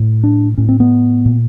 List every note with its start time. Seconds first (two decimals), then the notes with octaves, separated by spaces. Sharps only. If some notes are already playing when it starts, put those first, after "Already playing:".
Already playing: A2
0.23 D4
0.57 A2 C#4
0.69 C4
0.80 B3
1.26 A#2